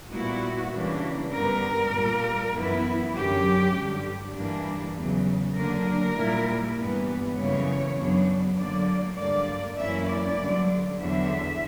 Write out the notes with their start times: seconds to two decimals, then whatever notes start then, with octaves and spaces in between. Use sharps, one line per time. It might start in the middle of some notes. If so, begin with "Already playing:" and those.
0.11 A#2 G3 B3 E4 F#4
0.72 C#3 E3 G3 A#3 D4
1.32 G2 D3 G3 B3 A#4
1.92 A#2 G3 A#3
2.53 F#2 E3 B3 E4
3.14 F#2 D3 F#3 C#4 G4
3.73 G2 D3 G3
4.34 G2 E3 G3 A#3 D4
4.94 E2 C#3 F#3
5.56 D3 F#3 A#3 D4 A#4
6.16 A#2 G3 A#3 E4
6.76 G2 E3 G3 B3
7.36 F#2 C#3 E3 G3 A#3 C#5
7.97 F#2 C#3 F#3 B3 D4
8.57 D3 F#3 A#3 D5
9.17 G2 D3 A#3 D5
9.78 F#2 E3 A#3 C#4 E4 E5
10.09 D5
10.38 G2 D3 F#3
11.00 E2 D3 F#3 E5